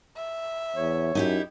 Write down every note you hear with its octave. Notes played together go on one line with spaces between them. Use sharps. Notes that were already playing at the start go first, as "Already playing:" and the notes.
E5
E2 C#5
F#2 D#4 E4 G4